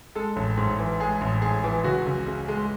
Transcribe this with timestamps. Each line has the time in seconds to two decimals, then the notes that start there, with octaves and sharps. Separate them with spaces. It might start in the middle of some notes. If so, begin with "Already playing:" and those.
0.15 G#3 A4
0.36 A1
0.57 G#2
0.79 E3
1.00 G#3 G#4
1.21 A1
1.42 G#2 G#4
1.64 E3
1.84 C#2 F#4
2.06 C#2
2.27 C#3
2.48 G#3